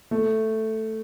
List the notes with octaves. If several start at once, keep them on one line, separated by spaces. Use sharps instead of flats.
A3